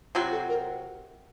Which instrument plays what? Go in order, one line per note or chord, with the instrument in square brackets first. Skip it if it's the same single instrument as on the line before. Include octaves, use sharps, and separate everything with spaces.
[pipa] C3 F#3 C4 F#4 [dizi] F4
[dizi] A4
A#4